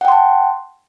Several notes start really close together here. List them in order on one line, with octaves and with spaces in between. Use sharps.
F#5 G5 C6 A5